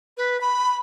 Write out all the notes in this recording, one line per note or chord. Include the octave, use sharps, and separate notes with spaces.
B4
B5